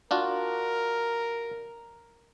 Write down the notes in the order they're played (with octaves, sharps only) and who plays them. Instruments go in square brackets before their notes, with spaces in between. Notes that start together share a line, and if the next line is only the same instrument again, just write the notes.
[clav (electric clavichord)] D4 F4 F#4 [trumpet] A#4